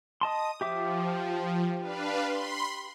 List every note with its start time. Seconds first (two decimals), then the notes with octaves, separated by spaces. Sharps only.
0.21 D#5 A5 C6 D#6
0.61 F3 G4 E5 D6
1.80 D4 B4 F5
2.23 B5 C6